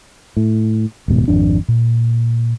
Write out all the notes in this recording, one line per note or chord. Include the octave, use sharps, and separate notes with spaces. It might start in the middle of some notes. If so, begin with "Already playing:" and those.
A2
D#1 G#2 B2
G#1 F2 D4
A#2